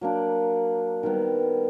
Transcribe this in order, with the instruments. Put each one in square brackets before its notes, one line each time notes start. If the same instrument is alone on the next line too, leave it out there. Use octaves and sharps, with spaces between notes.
[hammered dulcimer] F#3 A#3 D4
D#3 G3 B3